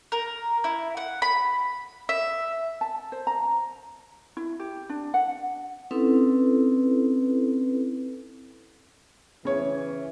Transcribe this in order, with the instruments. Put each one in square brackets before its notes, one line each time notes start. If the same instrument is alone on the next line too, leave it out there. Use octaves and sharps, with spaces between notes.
[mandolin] A#4
E4
F#5
B5
E5
[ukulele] A5
C5
A#5
E4
G4
D4
F#5
[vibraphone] C4 C#4 D#4 E4 A4 B4
[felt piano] C#3 C#5 [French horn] E3